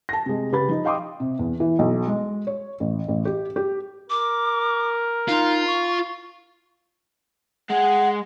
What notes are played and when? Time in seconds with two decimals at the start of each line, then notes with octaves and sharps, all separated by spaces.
0.09 A5 A#6
0.26 C3 G#3
0.52 C#3 G4 B4 B5 A6
0.69 F3 D#4
0.85 D#5 F5 G5 C6 D6 D#6
1.20 C3
1.39 E2
1.60 E3
1.79 B1
2.07 G#3
2.47 C#5
2.80 A1
3.08 A1
3.25 G4
3.56 G4
4.10 A#4 D6
5.29 D#4 F4
5.67 C#6
7.70 G#3 G#4 F#5